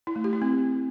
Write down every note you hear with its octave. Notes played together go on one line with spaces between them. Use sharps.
E4
A3
G4
E4
C4